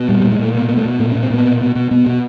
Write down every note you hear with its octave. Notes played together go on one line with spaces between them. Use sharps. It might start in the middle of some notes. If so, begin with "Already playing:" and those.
Already playing: B2
A#2 G3
G3
A#2
G#3
A#2 A3
B2 A#3
B2 A#3
A3
B2
A#2 A3
C#4
A#2
C4
A#2 B3
B2
B2
B2
B2 B3
B2